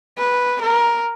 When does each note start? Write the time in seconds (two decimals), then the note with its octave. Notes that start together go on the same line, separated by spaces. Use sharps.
0.18 B4
0.61 A#4